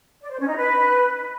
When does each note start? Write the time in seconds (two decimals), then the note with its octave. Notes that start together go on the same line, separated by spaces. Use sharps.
0.22 D5
0.30 C5
0.39 C#4
0.48 D#4
0.56 B4